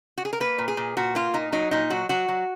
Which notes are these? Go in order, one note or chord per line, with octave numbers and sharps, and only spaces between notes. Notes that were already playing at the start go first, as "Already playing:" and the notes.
F#4
G#4
A#4
A#3 B4
A#2
G#4
A#2
A#2 F#4
A#3 F4
A#2 D#4
F#3 D#4
A#2 D#4
F#3 F#4
F#3 F#4
F#3